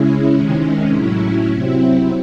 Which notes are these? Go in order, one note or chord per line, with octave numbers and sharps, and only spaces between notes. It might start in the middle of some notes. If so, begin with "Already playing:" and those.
Already playing: C#3 G#3 C#4 E4
C3 D#3 G#3 C#4
A2 F#3 C#4 E4
C3 F#3 C4 E4